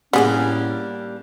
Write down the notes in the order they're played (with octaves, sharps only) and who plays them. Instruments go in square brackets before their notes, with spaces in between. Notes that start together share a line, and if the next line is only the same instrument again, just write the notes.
[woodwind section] A2 C#4 [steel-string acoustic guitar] G3 A#3 D4 [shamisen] B3 G#4